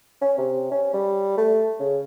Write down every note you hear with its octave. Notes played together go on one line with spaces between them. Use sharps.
C#4
C3
C#4
G3
A3
C#3